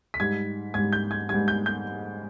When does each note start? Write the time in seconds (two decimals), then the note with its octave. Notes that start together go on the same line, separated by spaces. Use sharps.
0.14 B6
0.20 G#2 G3 G#6
0.74 G#2 G3 G#6
0.93 G6
1.11 G#6
1.29 G#2 G3 G#6
1.48 G6
1.66 G6